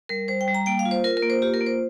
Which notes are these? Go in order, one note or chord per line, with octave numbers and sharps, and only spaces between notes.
G3 A#4
G3 C5
G5
G3
A#5
A#3 G5
F5
F4
C5
F4 A#4
A#4
A#3
C5
F4 G4
A#4
A#3
C5